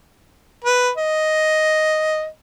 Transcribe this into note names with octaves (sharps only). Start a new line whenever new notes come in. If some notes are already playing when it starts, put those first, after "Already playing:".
B4
D#5